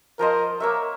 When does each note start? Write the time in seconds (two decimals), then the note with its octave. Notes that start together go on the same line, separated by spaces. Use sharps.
0.19 F3 A#4 C5 D#5
0.60 A#3 A#4 C#5 E5